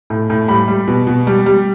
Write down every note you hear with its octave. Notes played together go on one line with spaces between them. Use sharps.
A2
A2
G3 B5
G3
B2
B2
G3
G3